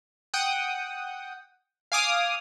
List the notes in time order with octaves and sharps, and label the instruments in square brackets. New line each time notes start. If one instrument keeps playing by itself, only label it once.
[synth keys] F#5 G5 D#6
F5 G#5 D6 D#6 F6